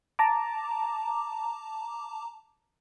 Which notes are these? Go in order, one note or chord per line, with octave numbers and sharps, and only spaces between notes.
A5 A#5 D6